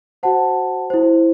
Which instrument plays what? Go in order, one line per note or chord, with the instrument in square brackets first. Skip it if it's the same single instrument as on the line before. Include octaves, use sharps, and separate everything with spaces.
[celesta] F#4 C5 F#5 A5
E4 C5